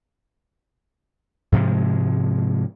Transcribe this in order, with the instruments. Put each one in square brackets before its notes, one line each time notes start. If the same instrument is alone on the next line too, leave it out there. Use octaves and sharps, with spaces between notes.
[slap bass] G#2 C3 F3 G#3